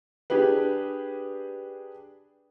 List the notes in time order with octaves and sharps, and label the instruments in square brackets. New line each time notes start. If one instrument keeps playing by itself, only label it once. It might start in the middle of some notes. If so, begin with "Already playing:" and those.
[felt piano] D4 G4 G#4 B4